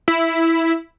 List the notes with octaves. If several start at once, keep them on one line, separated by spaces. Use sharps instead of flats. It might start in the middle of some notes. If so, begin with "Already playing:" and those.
E4